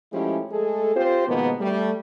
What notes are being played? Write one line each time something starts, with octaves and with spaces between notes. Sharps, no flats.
F3 G#3 A3 C#4 E4 G4
G#3 A3 G#4 A4
C4 F4 G4 C5
G#2 B2 D#3 F3 A#3 B3
G3 A3